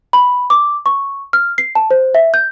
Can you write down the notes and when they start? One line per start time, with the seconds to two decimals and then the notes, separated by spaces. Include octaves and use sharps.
0.13 B5
0.50 D6
0.86 C#6
1.33 F6
1.58 C7
1.75 A5
1.91 C5
2.15 E5
2.34 G6